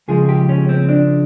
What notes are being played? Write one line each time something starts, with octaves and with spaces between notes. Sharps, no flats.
C#2 C#3 F3 G#3 G#4
G4
C#4
C4
D4